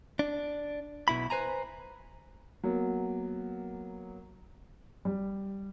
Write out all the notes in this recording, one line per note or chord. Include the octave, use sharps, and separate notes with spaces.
D4
B1 B2 E4 B5
B4 C5 G#5 A#5
F#3 A#3 B3
G3